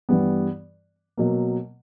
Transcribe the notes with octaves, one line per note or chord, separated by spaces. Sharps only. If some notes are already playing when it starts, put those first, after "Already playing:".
G2 E3 G3 B3
B2 F#3 A#3